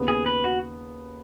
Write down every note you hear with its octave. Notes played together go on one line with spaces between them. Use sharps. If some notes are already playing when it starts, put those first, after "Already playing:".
Already playing: D#2 C#3 B3
G#4
B4
F#4